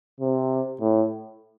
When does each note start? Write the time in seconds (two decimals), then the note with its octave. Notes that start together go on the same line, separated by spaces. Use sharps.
0.21 C3
0.81 A2